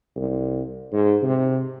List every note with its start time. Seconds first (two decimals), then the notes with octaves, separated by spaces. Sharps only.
0.16 C2
0.92 G#2
1.23 C3